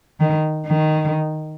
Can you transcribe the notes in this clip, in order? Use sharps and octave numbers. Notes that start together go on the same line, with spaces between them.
D#3
D#3